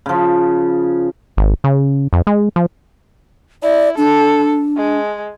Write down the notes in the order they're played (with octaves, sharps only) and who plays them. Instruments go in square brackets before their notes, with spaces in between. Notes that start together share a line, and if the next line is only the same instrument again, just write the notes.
[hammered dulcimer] C#3 F3
[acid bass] G#1
C#3
F2
G#3
F3
[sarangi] E4 [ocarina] D5
[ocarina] D4 [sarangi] A4
[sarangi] G#3